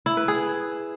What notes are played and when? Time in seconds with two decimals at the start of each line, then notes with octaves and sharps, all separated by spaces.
0.06 E4
0.17 B4
0.28 G#4